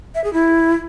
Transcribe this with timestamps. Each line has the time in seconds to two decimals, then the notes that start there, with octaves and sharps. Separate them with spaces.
0.15 E5
0.24 G#4
0.33 E4